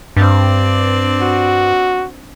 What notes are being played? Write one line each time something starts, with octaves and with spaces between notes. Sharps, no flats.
G2 C4 D4 D5
F#4